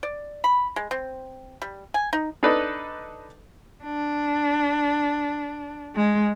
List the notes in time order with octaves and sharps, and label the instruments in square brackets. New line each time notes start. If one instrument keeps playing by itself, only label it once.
[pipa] D5
B5
G#3
C4
G3
G#5
D#4
[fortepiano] D4 D#4 A4 B4 D#5
[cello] D4
G#3